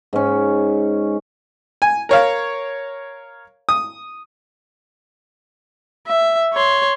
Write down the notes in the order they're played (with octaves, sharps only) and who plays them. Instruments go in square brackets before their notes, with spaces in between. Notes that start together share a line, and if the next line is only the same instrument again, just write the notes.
[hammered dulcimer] G#2 C#4
[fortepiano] G#5
A#4 C#5 F5
D#6
[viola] E5
C#5 C6